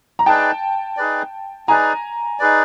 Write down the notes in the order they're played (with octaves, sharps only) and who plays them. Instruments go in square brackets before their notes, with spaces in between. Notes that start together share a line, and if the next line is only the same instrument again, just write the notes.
[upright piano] A#5
[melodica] D#4 G#4 B4 D5 [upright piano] G5 A5
[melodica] D#4 G#4 B4 D5
[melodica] D#4 G#4 B4 D5 [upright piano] G#5 A#5
[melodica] D#4 G#4 B4 D5